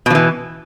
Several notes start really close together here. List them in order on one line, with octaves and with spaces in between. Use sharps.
B2 F3 E3